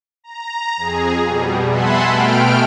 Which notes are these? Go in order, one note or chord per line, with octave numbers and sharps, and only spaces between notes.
A#5
F2 G#4
B2 G3
E5 F#5 G#5 A5 B5 C6
B2 A3 G5 F6 D7